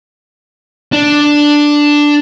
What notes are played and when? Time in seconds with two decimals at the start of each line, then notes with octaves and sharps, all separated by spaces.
0.92 D4